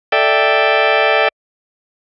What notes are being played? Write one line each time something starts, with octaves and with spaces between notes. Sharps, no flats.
A4 D5 E5 G5